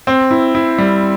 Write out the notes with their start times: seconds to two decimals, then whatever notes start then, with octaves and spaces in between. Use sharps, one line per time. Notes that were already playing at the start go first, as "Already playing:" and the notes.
0.07 C4
0.31 E4
0.55 E4
0.78 G3